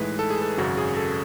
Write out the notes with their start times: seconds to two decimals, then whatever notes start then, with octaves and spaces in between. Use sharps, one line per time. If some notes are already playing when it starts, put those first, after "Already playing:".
Already playing: A2 E3 G#3 D#4 B4
0.19 A4
0.30 G#4
0.42 A4
0.57 G#1 F#2 C#3 F#4
0.77 G#4
0.97 A4